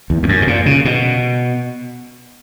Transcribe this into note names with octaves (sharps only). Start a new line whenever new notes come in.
E2
E2
F#2
B2
A#2
C#3
B2